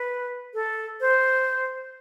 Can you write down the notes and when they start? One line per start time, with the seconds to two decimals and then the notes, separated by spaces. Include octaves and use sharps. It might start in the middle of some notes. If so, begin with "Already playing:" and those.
Already playing: B4
0.54 A4
1.01 C5